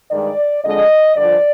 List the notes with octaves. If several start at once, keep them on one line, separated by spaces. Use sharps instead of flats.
G2 D#3 G#3 D5
F2 D3 G#3 D#5
G2 D3 F3 D5